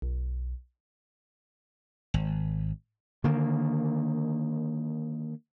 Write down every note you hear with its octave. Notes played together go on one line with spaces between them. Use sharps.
B1
G#1
D3 D#3 A#3